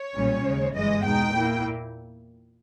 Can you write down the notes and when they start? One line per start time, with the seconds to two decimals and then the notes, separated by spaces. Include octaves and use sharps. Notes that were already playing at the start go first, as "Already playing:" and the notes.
Already playing: C#5
0.16 B1 A#2 G3 C#4
0.46 D#2 C#3 G#3
0.75 G1 G2 E3 G#3 D#5
1.05 E2 B2 G#3 D#4 G5
1.34 A#2 A#3 E4